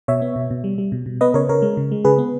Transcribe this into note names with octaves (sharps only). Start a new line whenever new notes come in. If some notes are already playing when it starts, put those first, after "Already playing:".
B2 C#5 E5
B3
B2
B2
G3
G3
B2
B2
B3 B4 D#5
C#3 A#4 C#5
C#3 A#4 C#5
G#3
C#3
G#3
C#3 G#4 B4
B3